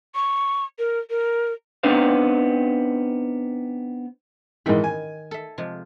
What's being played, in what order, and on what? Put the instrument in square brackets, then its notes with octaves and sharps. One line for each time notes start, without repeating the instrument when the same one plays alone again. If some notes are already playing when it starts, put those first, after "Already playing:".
[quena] C#6
A#4
A#4
[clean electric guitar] B3 C4 D4 D#4 C5 F5
[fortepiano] G#2 E3 [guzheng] D#3 G5 B5
[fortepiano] G#5
[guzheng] A4 E5
C3 F3 G#3